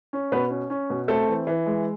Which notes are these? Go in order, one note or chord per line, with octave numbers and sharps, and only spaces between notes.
C#4
B2 B3 B4
C#4
C#4
B2
A3 C4 A4
E3
E3
G#3